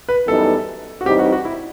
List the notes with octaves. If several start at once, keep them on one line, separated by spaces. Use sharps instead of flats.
B4
F#2 E3 G3 B3 D#4 A4
F#4
A2 E3 G3 C4 D#4 G4
F#4
F#4
E4